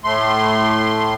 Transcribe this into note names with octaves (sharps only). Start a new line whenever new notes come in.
A2 A3 C6